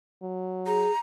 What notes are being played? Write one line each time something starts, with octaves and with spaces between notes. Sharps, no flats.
F#3
G#4 A#5